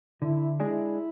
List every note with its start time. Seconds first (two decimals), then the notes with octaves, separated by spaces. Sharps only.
0.22 D3 E4
0.60 G#3 D4 E4 G#4